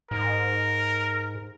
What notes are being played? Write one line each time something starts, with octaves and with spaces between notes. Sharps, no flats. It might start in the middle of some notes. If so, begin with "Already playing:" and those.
G#2 A#4